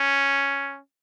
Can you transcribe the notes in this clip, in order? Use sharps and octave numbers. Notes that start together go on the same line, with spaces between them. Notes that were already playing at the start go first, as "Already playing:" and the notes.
Already playing: C#4